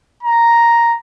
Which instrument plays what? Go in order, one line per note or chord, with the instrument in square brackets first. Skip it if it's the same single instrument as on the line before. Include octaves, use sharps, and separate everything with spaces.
[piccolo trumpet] A#5